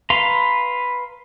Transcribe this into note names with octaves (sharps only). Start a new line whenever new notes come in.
B4 F5 A#5 C6